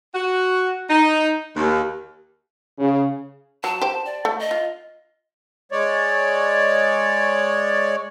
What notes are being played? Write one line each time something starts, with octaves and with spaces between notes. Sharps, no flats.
F#4
D#4
D#2
C#3
F#3 A5
G4 C5
D5
A3
D#5
F4
G#3 C#5 D5